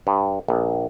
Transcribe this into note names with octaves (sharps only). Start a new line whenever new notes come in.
G2
A#1